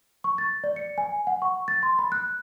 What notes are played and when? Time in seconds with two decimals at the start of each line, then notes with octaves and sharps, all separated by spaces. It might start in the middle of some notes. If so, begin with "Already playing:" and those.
0.24 C#6
0.38 A6
0.64 D5
0.76 C#7
0.98 G#5
1.27 F#5
1.42 C#6
1.68 A6
1.83 C6
1.99 B5
2.12 F#6